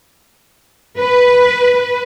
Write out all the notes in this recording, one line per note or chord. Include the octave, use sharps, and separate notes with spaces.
B4